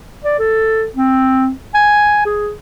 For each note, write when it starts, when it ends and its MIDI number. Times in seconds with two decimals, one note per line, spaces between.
0.24 0.36 74
0.39 0.85 69
0.95 1.50 60
1.74 2.23 80
2.26 2.52 68